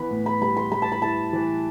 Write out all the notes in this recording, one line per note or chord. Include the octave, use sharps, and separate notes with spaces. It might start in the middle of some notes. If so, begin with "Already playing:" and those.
Already playing: E3 B3 B5
A2
B5
G3 B5
C6
G3 B5
A5
B5
E4 A5
E3